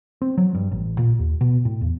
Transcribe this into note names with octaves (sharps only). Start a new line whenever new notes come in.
C4
F#3
G2
A1
A#2
D#2
B2
A2
E2